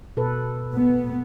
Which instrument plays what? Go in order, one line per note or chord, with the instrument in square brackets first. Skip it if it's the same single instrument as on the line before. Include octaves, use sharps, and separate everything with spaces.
[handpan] B2 A4 B4
[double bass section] B3